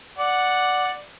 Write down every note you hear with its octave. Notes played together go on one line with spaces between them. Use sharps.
D5 F#5